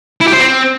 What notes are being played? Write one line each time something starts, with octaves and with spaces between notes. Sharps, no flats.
E4
G4
C5
C4